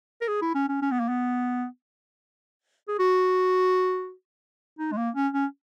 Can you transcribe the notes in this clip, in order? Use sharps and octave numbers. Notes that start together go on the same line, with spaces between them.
A#4
G#4
E4
C#4
C#4
C#4
B3
A#3
B3
G#4
F#4
D#4
G#3
A#3
C#4
C#4